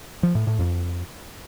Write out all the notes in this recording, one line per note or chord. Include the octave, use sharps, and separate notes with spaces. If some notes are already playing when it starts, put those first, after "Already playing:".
F3
A2
A2
F2